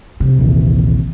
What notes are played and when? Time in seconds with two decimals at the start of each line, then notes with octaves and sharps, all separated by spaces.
0.20 C3
0.39 A#1 D#2 E3